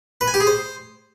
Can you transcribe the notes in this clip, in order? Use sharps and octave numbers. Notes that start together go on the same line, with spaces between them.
B4
G#5
G4
G#4
C5